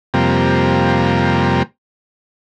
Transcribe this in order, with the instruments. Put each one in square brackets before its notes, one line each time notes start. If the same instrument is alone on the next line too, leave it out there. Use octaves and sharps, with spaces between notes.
[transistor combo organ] F2 C3 G3 A#3